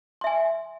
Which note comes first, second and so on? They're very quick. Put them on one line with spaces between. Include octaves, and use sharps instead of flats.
C6 E5 G#5